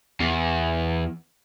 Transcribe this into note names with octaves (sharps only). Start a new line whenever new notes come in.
E2